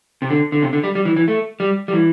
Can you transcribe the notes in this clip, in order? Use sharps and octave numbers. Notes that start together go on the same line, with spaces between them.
C3
D3
D3
C3
D3
G3
G3
E3
E3
A3
G3
G3
E3